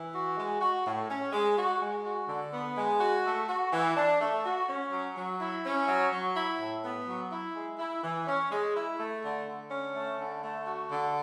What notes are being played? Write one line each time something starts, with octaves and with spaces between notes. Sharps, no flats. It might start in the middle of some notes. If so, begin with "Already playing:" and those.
Already playing: E3
F#4
G#3
F#4
A2
C#4
G#3
F#4
G#3
F#4
D3
B3
G#3
F#4
A3
F#4
E3
D4
A3
F#4
C#4
F#3
F#3
E4
C#4
F#3
F#3
E4
A2
B3
F#3
E4
G#3
E4
E3
C#4
G#3
E4
A3
D3
D3
C#4
A3
D3
A3
F#4
D3